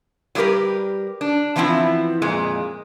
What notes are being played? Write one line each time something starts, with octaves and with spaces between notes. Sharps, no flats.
F#3 G3 A3 G4 A#4 B4
D4
E3 F3 B3 C4 E4
F2 A#2 G#3